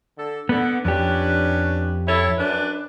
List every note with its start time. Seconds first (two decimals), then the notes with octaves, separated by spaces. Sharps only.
0.18 D3 A4
0.49 D3 B3
0.85 F2 C#4 D4 G4 B4
2.07 E4 A4 C#5
2.37 F#2 D4 B4